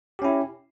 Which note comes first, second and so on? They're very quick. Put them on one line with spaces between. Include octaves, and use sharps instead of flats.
G4 C#4 E4